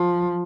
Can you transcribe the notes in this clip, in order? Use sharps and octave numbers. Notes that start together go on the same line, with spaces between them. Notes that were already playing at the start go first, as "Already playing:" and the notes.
Already playing: F3